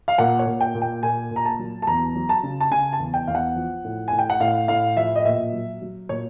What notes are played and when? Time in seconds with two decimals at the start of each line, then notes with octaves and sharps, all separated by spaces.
0.08 F5
0.18 A#2 F#5
0.39 C#5
0.46 A#2
0.61 G5
0.75 A#2
0.82 G5
1.03 A#2 G#5
1.31 A#2
1.36 A#5
1.45 A5
1.59 F#3
1.82 A5
1.87 E2 A#5
2.15 F#3
2.29 A5
2.43 C#3
2.60 A5
2.71 C#3 G#5
2.93 A5
3.00 E2
3.14 G5
3.28 E2 F5
3.35 F#5
3.56 F3
3.84 A2
4.08 A2 G#5
4.19 G5
4.30 F#5
4.40 A2 F5
4.68 A2 F5
4.97 F3 E5
5.16 D#5
5.25 A#2 E5
5.53 F#3
5.82 F#3
6.09 A#2 C#5